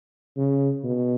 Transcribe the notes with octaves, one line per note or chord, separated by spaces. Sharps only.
C#3
B2